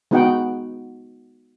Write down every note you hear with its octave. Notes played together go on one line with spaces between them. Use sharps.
G#3 B3 D#4 F#4 F#5 G5